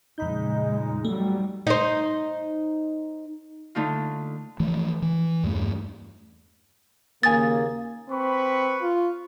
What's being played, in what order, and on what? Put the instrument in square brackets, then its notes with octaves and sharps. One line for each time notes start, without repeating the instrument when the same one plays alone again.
[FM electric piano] F2 B5 G6 [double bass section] A#2 C#3 G#3 [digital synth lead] D#4
[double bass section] F2 F#3 G3 [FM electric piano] A3
[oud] D#4 C5
[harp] D3 A3 D#4 F4
[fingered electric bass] E3 F3 A3
E3
E2 G2 A3
[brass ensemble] D#2 C#3 A#3 [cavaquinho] G#5 D#6 [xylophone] A6
[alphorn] C4 [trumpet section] B4 B5 C#6
[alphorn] F4